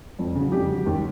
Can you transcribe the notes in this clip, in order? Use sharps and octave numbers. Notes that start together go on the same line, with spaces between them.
F2
C#3 F#3
F2 G4
C#3 F#3
D#2